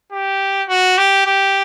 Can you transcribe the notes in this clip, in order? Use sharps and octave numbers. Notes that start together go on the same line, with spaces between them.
G4
F#4
G4
G4